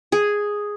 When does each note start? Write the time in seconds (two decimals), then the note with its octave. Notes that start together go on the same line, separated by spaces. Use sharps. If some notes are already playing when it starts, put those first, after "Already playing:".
0.12 G#4